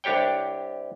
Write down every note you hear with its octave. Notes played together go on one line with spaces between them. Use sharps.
C2 D4 G4 C#5 G5